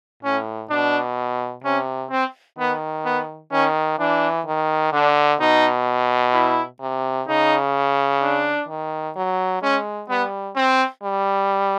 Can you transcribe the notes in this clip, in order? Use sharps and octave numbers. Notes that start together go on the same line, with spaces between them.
A2 C#4
B2 D4
C3 C#4
C4
D#3 B3
B3
D#3 C#4
E3 D4
D#3
D3 D4
B2 D#4
E4
C3
C#3 D#4
D4
D#3
F#3
G#3 C#4
G3 B3
C4
G3